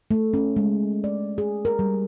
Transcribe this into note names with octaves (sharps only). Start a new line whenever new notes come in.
A3
C#4
G#3
D5
G#4
A#4
G3